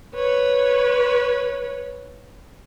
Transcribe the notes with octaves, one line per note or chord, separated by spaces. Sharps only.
B4 C#5